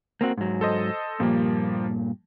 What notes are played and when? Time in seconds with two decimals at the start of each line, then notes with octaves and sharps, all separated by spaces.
0.21 A#3 C4 F#4
0.38 G#2 F#3
0.61 A4 C5 D#5
1.20 G2 A#2 F3 G3 A#3